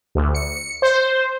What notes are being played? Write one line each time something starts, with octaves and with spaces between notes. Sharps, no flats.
D2
C#7
C5